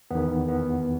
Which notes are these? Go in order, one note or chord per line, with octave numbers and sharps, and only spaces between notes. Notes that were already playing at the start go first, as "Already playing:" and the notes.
E2 D#3 B3
B3